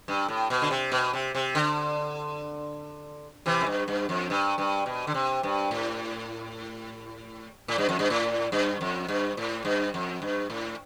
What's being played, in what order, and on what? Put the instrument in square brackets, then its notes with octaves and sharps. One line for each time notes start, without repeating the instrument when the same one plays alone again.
[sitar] G2
A2
B2
D3
C3
B2
C3
C3
D3
C3 E3
F2
G2
G2
F2
G2
G2
B2
D3
C3
G2
A2
A2
G2
F2
G2
A2
G2
F2
G2
A2
G2
F2
G2
A2